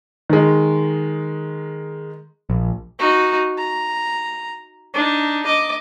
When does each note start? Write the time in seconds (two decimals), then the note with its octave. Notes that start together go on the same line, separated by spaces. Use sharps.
0.29 D#3 G#3
2.50 A#1
2.99 D#4 F#4
3.58 A#5
4.94 D4 D#4
5.46 D#5 D6